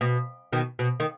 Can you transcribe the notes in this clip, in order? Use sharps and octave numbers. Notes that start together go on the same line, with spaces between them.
B2
B2 D#3
B2
D#3